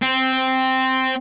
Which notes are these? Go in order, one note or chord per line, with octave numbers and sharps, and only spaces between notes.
C4